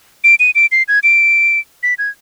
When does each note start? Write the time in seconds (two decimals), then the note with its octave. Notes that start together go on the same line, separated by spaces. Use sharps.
0.24 D7
0.40 D#7
0.55 D7
0.72 C7
0.88 G#6
1.03 D7
1.83 B6
1.98 G#6